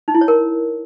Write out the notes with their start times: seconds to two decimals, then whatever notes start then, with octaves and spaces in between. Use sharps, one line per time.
0.08 D#4
0.15 E4
0.21 C#5
0.28 A#4